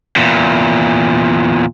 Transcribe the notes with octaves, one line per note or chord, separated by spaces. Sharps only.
E2 A#2